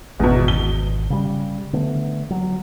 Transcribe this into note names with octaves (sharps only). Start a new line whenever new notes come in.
G#1 E2 B2
G7
C#3 G3
D3 A3 B3
F#3